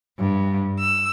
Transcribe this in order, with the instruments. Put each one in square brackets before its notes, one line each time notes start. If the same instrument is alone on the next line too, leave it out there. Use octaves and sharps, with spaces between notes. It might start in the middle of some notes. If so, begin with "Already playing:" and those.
[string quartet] G2
E6